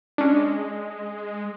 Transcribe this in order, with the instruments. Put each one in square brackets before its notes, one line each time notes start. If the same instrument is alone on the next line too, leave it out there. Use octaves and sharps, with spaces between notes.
[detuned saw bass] G#3 [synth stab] C#4 D4